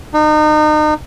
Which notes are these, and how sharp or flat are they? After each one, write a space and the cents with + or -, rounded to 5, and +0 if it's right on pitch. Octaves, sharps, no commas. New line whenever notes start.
D#4 -35